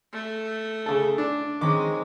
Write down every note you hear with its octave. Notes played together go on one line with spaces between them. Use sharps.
A3
C#3 A4
D4
D#3 G#3 C4 C#4 D6